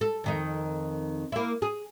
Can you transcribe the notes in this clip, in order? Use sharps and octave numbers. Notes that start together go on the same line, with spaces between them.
A4
F2 D#3 D#4
A#3 E4
G#4